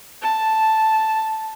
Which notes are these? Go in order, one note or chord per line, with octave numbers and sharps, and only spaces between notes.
A5